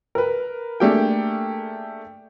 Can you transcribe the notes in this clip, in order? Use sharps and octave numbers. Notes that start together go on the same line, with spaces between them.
A#4 B4
A3 A#3 D4 G4 G#4 G5